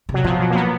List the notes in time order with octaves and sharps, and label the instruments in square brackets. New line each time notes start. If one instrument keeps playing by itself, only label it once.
[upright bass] C3
[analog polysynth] F#3
[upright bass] B2 [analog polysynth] F3
[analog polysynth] F#3
A#3
B3